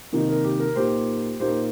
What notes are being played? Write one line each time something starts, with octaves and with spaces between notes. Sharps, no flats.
C3 D#3 A#3 D#4
A#4
G4
A#4
A#2 A#3 D#4 G4 C5
A#2 A#3 D#4 G4 C5